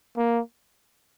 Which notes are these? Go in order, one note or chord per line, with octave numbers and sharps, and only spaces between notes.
A#3